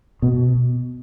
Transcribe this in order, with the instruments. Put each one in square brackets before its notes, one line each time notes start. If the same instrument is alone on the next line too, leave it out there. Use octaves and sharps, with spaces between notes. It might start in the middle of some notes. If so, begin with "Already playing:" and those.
[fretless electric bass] B2